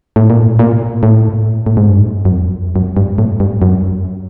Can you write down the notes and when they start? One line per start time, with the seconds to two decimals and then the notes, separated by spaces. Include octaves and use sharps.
0.16 A2
0.30 A#2
0.42 A2
0.59 A#2
1.03 A2
1.66 A2
1.77 G#2
1.89 G2
2.25 F#2
2.32 F2
2.76 F#2
2.97 G2
3.18 A2
3.40 G2
3.62 F#2